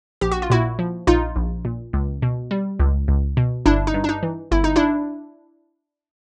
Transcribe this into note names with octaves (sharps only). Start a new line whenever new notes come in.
A#1 G4
F#4
F4
A#2 E4 F#4
F3
A#1 D#4 F4
A#1
A#2
C#2
B2
G3
C#2
C#2
B2
G1 D4 E4
D#4
G2
D4
D#4
E3
G1 E4
D#4
D4 E4